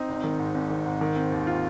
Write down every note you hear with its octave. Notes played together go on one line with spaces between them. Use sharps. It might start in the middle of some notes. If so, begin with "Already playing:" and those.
Already playing: C4 D#4
G#1
D#3
G#2
G#1
D#3
G#2
D#3
C4
D#2
F4